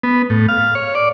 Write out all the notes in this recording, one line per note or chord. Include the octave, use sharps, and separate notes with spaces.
B3
A2
F5
C#5
D5